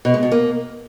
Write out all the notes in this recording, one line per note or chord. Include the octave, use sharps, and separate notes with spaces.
B2
G#3
B2
A#3